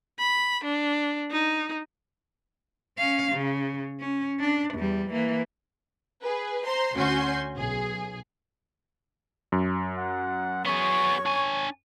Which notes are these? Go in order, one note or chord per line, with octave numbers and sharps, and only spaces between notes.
B5
D4
D#4
C#4 F5
C#3
C#4
D4
E2 G3
E3 A#3
G#4 B4
C5 A#5 C6
D2 C#4 F#4 G#5 C6 G6
B1 G#4
F#2
F#5
B3 G#4 C#5 C#6
D4 G#5